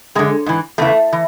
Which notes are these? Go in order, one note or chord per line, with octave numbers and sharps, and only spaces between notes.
F#2 D3 G#3
G#2 E3
E2 C#3 E3 A3
E3